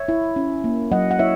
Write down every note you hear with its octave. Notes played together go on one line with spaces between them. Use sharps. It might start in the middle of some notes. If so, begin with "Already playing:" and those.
Already playing: C#5 E5
E4
C#4
A#3
F#3 D#5 F#5
F#5
E4 C#5 E5